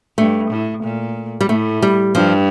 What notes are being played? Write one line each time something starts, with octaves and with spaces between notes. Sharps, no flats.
G2 A3
A2
A#2
G3
A2 A3
G3
G2 F3